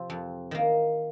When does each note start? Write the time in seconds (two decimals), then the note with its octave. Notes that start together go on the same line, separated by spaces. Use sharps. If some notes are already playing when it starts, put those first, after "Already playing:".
Already playing: C3 F3 C4
0.10 F2
0.51 D#3 A#3